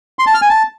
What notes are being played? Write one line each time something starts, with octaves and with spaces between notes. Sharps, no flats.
C6
A5
F6
G#5
A5